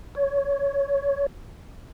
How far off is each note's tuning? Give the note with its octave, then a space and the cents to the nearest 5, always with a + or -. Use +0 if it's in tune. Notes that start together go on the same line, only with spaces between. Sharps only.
C#5 +15